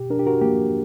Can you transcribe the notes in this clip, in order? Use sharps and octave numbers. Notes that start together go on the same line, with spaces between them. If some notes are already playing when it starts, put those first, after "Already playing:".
Already playing: B2 G4
D4 A#4
G4
F#4 A#4
A#3 G4